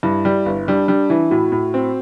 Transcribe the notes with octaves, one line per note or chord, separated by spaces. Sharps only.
G2 E4
G3
G1
G3 D4
G3 D4
E3 E4
A2 F#4
A2
C4